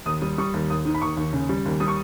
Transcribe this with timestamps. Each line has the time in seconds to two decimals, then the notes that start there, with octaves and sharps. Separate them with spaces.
0.06 D#2 D#6
0.22 G3
0.38 G3 C#6
0.54 D#2
0.70 D#2 D#6
0.85 D#3
0.95 B5
1.02 D#2 C#6
1.17 D#2
1.33 C#3
1.49 G3
1.65 D#2
1.80 G3 D#6
1.88 C#6